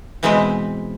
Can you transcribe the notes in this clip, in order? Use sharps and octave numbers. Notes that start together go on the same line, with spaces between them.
B2 E3 G#3 C4 B4 C5